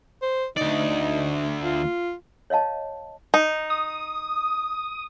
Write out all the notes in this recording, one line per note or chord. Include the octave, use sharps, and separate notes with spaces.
C5
D2 D#4 D5
F4
C#5 D#5 F5 A5
D#4
D#6